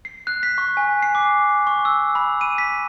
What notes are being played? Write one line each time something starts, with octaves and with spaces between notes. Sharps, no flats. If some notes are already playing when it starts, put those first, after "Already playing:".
C7
F#6
B6
C#6
G#5
C7
D6
C#6
E6
B5
D#7
B6